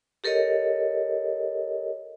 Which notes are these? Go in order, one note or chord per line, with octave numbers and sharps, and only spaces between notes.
G4 A4 A#4 C#5 D#5